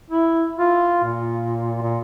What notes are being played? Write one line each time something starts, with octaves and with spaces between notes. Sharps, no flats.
E4
F4
A#2
A#2